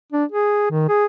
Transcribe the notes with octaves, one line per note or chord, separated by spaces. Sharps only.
D4
G#4
D#3
G#4